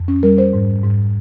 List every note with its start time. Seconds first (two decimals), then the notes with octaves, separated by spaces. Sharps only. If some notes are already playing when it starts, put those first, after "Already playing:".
Already playing: F2
0.08 C#4
0.23 G3 A#4
0.38 C5
0.53 G#2
0.84 G#2